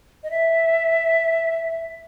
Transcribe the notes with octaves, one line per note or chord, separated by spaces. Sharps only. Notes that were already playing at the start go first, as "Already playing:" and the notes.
D#5
E5